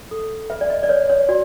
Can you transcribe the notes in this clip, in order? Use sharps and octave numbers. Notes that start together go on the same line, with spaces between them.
A4
B4 E5
D5
D#5
D5
B4 C#5
C#5
F#4 D5